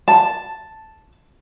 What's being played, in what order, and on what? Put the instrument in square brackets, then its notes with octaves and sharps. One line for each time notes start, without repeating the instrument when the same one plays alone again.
[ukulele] A5